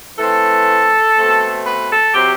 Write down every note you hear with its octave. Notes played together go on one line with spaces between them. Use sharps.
E3 A3 C4 A4
B2 A3 C4
B4
A4
C3 F#3 C4 G4